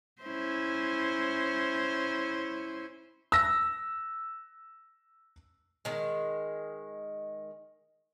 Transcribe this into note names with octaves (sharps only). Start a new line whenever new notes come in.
C#4 E4 C5
E6 A#6
D#3 G#3